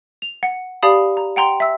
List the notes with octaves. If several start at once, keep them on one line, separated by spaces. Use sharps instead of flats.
F7
F#5
G4 D5 F5 A5 B5 D#6
A#5
F#5 G5 A#5 C6
E5 E6